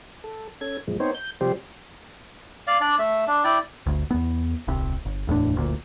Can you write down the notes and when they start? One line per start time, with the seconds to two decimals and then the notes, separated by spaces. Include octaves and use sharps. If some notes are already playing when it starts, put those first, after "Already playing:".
0.24 A4
0.61 C#4 A4 G#6
0.88 F#2 A#2 F3 G#3
1.00 B3 C4 D#4 C5 C#5
1.15 G6
1.41 C3 F3 G3 G4 C5
2.67 D5 F5
2.81 D4 D5
2.99 A3 E5
3.27 D4
3.44 E4 D5 G5
3.86 G1 D2
4.11 E2 B3
4.68 D#1 C2 C3
5.05 G1
5.27 D1 E2 A2 D4
5.55 F#1 D2 A#2